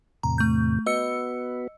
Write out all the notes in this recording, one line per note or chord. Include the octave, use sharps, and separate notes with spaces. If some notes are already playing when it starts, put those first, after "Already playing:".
E2 A2 C3 A#5
A3 G6
B3 F#4 B4 D#5 E6 C#7